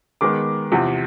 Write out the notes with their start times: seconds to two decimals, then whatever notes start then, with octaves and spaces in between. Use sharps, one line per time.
0.21 D#3 G#3 B3 D6
0.72 E2 C3 F3